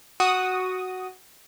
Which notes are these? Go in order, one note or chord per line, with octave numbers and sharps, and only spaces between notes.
F#4 D#6